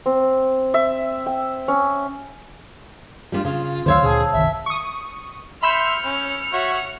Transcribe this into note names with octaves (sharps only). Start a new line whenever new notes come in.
C4
E5
G5
C#4
G3 B3 D4 F4
C#3 F4
D2 D#3 C5 C#5 F5 C6 E6
D2 A#2 D3 G#4 A5 E6
G1 C2 D#3 E5
C#6 D#6
E5 B5 C6 E6 F6 G6 C#7
C#4
F#4 C#5 E5